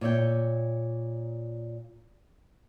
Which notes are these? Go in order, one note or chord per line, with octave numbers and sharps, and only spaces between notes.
A#2 C#5 E5 G5